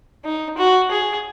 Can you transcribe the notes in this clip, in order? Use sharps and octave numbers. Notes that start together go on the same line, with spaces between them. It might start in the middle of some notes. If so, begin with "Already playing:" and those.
D#4
F#4
G#4